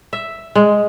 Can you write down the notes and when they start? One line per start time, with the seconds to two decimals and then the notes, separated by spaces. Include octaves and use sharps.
0.13 E5
0.55 G#3